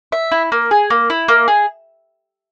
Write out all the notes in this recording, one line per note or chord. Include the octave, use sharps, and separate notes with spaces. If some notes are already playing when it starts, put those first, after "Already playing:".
E5
E4
A#3
G#4
A#3
E4
A#3
G#4